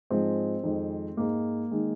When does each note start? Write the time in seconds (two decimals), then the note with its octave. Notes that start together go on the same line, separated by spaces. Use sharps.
0.10 G#2 F3 G#3 C4
0.63 F2 D#3 G#3
1.17 G#2 G#3 A#3
1.71 D#3 G#3